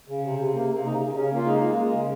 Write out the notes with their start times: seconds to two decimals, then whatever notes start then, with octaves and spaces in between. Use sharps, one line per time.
0.08 C#3
0.23 C3
0.39 C3
0.54 A#3
0.70 C3
0.85 C#3 D#4
1.01 C#3
1.15 C#3 C#4
1.32 A#3 F4
1.47 G#3 D#4
1.63 G#3
1.77 G#3
1.93 C#3